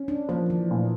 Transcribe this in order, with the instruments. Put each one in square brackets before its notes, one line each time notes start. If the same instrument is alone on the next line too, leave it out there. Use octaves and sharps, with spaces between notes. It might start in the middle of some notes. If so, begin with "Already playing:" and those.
Already playing: [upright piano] C#4
[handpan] D4
[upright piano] F3 [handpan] A#3
[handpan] E3
[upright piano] A#2